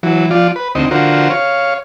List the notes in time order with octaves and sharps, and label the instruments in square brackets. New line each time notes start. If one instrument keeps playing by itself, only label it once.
[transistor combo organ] E3 F#3
F3 F4 D5
B4
D2 C4 D#4 D#5
D3 F4 F#4 A#4 C5
C#5 F5